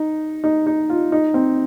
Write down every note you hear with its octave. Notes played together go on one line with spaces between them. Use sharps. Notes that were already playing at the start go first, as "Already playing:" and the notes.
Already playing: D#4
D#4
D#4
F4
D#4
C4